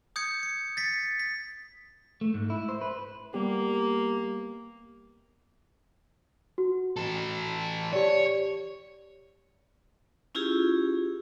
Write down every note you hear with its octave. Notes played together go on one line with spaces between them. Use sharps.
D#6 G6 G#6 C#7
C#7
A6 B6 C#7
B6
A3
G#2
E4
C5
B4
G3 A#3 B3 G4
F#4
E3 A4
G4 C#5 D5
C#4 E4 F4 G4 G#4